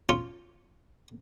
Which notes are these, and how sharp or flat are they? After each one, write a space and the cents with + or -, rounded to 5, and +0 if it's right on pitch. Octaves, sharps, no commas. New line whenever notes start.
C#4 +0 F4 -5